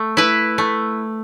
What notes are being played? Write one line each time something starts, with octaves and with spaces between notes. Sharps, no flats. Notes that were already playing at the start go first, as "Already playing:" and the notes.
Already playing: A3
E4 B4
A3